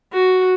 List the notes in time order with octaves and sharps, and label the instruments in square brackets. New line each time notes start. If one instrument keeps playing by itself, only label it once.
[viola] F#4